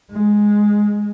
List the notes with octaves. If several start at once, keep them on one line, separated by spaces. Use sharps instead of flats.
G#3